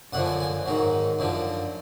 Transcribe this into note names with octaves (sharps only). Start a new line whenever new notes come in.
F#2 D3 F3 F#5
G#5
G#5
G#2 D#3 F#3
F#2 D3 F3